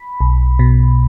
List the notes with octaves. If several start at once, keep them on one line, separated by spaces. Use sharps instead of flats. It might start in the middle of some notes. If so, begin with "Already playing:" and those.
Already playing: B5
B1
B2